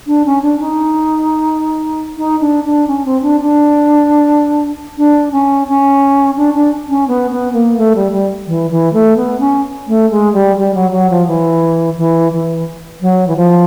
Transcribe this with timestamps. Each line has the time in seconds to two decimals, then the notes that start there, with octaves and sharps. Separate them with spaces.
0.07 D4
0.25 C#4
0.42 D4
0.59 D#4
2.17 D#4
2.40 D4
2.64 D4
2.87 C#4
3.05 C4
3.22 D4
3.40 D4
4.97 D4
5.32 C#4
5.67 C#4
6.36 D4
6.54 D4
6.89 C#4
7.07 B3
7.30 B3
7.53 A#3
7.77 A3
7.95 G3
8.11 G3
8.47 E3
8.70 E3
8.93 A3
9.16 B3
9.40 C#4
9.87 A3
10.10 G#3
10.33 G3
10.56 G3
10.74 F#3
10.91 F#3
11.10 F3
11.26 E3
11.97 E3
12.32 E3
13.01 F#3
13.27 E3
13.36 F3